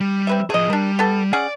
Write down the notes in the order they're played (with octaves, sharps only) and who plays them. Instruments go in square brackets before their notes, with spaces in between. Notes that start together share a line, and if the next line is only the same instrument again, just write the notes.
[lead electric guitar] G3
[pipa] C4 B4 E5
[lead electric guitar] F3 G#4 [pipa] A3 D#5
[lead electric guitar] G3 [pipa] D4 A#4
[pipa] B3 A4
[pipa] C#4 G#4 F#5 [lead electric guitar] D5